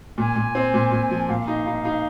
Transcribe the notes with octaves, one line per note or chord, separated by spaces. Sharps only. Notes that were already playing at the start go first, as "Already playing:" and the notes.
A#2 G#5
A#2
C4
A#2
A#2
F3
A#2 F5
D#4
D#4
D#4